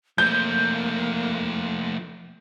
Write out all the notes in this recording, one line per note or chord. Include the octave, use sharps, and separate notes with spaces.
F3 A3 A#3 G6